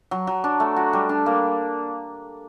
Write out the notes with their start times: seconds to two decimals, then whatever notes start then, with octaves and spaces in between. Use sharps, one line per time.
0.11 F#3
0.27 F#3
0.44 D4
0.60 A3
0.76 F#4
0.93 G3
1.09 D4
1.26 A#3